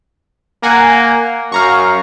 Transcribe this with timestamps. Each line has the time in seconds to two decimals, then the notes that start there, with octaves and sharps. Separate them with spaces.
0.63 A#3 F#5 G#5 A#5
1.52 F#2 F5 A#5 C#6